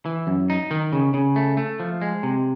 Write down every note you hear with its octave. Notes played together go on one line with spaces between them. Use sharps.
E3
F#2
D#4
D#3
C#3
C#3
A3
A3
F3
G#3
C3